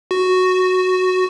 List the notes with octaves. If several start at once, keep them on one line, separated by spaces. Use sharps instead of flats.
F#4